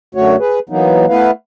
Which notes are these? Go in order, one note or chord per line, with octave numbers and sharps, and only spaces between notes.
F#2 D3 A3 F#4 C#5
G#4 B4
E3 F#3 A#3 B3 D#4
A3 B3 E4 B4 F5